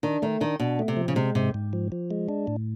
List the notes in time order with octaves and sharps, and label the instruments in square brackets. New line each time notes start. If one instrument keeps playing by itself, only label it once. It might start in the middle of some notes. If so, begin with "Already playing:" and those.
[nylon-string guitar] D#3 [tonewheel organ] D4
[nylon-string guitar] D#3 [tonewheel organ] A3
[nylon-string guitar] D#3 [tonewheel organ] D4
[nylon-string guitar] B2 [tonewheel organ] D4
[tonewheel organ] A3
[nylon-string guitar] C3
[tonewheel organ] F3
[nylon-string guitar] C#3
[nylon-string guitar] C3 [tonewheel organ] G#3
[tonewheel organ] G#2 [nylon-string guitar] C3
[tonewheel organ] G#2
F3
F3
G#3
D4
A2